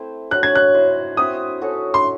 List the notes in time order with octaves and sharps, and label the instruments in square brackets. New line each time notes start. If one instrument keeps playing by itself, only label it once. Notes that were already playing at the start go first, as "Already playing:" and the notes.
Already playing: [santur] A3 C4 E4 C5
[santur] F#3 C#4 F#4 [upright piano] F#6
[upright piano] G#6
F#6
[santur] E4 C5 D#5
[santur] C4 F#4 C5 E5 [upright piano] D#6
[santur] C#4 F#4 A4
[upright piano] C6